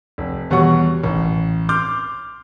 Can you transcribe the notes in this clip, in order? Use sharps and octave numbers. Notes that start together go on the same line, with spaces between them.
F1
E2 B2 G3 C#5 F#5 C#6
A1
C6 D6 F6 G6